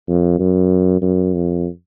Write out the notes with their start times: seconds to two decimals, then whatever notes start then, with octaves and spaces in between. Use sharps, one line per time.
0.08 F2
0.39 F#2
1.01 F#2
1.34 F2